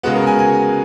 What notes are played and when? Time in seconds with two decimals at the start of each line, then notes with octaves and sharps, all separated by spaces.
0.03 C#3 G#3 B3 F#4
0.16 A#4
0.27 G#5
0.39 G#5